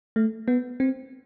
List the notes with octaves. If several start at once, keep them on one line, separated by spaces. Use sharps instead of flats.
A3
B3
C4